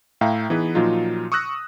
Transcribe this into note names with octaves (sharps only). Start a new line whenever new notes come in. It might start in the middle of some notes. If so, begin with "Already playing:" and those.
A2 E5 F5 G5 A#5
E3 B3 D#4 G#4 B4
A#2 F3 F#3 D#4 F4
C#6 D#6 E6 F#6 A#6